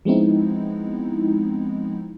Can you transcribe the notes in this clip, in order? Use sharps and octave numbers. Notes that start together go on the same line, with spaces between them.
F3 G#3 B3 C4 D#4 E4